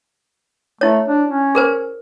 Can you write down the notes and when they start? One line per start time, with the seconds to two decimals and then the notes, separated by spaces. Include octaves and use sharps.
0.81 A3 E4 C#5
1.09 D4
1.30 C#4
1.55 G#4 A#4 C5